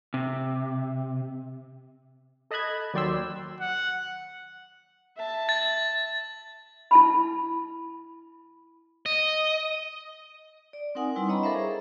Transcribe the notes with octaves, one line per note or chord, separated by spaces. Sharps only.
C3
A4 D#5 A5 B5 F#6 G#6
D#2 F#3 D5 G5 C6 E6
F#5
E5 A5
A6
E4 A5 B5
D#5
D5
C4 D#4 A#4 F#5 G#5 D#6
G3 D#4 E4 B4 G#5 C6
D4 C#5 D#5 A#5 B5 C#6
A4 A#4 C5 E5 F5
G#4